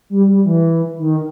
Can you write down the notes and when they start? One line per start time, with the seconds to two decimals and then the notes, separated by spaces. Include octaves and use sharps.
0.10 G3
0.28 G3
0.45 E3
0.98 D#3